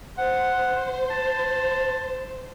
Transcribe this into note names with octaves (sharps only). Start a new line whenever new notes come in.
C5 F#5
A5